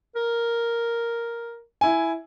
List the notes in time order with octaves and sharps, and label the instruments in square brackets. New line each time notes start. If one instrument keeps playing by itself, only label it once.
[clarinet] A#4
[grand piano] E4 G#5